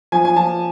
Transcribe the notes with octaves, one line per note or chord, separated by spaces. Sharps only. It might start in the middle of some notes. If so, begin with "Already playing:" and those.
F3 G#5
G#5
F3 A5